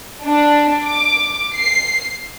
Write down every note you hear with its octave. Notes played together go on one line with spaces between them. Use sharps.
D4
D6
C7